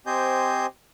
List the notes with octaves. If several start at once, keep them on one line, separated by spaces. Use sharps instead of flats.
C4 G4 C5 D#5 G#5 G6